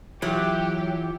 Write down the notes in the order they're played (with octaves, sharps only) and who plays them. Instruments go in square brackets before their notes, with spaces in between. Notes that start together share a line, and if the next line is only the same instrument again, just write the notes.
[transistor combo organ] E3 [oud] F#3 [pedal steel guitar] F4 E5 F6 [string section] G4